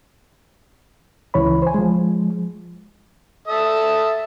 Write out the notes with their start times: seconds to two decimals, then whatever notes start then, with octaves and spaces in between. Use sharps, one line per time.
1.34 C#2 E3 C#5 B5
1.62 C5 G#5
1.74 F3 G#3
3.48 A4 E5 D#6